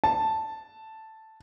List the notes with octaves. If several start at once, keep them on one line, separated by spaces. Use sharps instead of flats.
A5